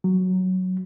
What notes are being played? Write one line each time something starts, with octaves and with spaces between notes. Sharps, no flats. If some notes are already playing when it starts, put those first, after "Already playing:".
F#3